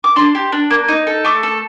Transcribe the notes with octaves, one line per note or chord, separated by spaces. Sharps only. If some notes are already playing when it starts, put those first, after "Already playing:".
D6
D4 C6
G4
D4
A#3
D#4
A4
A3 D6
A4